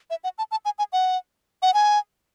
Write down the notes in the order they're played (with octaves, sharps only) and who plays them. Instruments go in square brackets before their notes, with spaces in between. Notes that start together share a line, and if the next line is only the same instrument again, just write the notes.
[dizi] E5
F#5
A5
A5
G#5
G#5
F#5
F#5
G#5